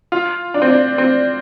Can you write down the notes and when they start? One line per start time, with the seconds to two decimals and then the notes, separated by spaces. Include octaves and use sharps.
0.12 F4
0.54 D4
0.62 C4
0.69 D4
0.98 C4